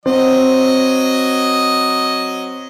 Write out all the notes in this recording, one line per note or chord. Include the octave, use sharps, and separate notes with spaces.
F#3 C4 D#5